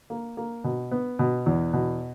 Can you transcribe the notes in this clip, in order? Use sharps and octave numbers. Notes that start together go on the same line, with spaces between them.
A#3
A#3
B2
B3
B2
E2
B2